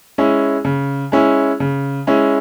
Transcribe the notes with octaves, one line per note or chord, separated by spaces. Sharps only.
G#3 C#4 E4
C#3
G#3 C#4 E4
C#3
G#3 C#4 E4